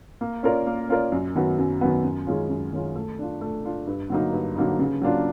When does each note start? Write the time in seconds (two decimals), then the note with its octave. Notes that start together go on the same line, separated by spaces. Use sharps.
0.21 A#3
0.43 C#4 F4 A#4 D5
0.66 A#3
0.89 C#4 F4 A#4 D5
1.12 F#2
1.35 D#3 F#3 B3
1.58 F#2
1.81 D#3 F#3 B3
2.04 F#2
2.27 D#3 G#3 C#4 F4
2.50 F#2
2.73 D#3 G#3 C#4 F4
2.96 A3
3.18 D4 F4
3.41 A3
3.64 D4 F4
3.87 G2
4.10 D3 F#3 A#3 D#4
4.33 G2
4.56 D3 F#3 A#3 D#4
4.79 C#3
5.01 F#3 A#3 D4 F4